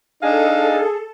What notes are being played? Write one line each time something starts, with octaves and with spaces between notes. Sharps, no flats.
D4 D#4 G#4 A4 D#5 F5